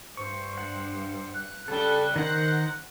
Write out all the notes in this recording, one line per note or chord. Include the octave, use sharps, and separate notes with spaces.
G2 C5 C#6
F#5
F#6
C#3 G3 A4
D#3 A#4 C5 F#5